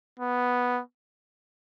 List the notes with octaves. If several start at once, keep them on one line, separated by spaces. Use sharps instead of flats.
B3